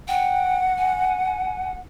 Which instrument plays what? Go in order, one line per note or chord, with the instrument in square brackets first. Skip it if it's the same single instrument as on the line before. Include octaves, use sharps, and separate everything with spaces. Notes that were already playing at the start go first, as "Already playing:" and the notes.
[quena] F#5 [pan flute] G5
[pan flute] G#5